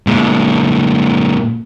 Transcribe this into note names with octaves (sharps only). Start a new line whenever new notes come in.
A#2 G#3